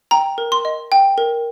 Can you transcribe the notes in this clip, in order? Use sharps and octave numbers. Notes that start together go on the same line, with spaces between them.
G5 A#5
A#4
C6
D#5
G5
A#4